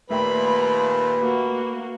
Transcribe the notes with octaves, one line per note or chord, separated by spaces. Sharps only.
D#2 A#2 A3 B4 E5 G5 B5
A#3 F#4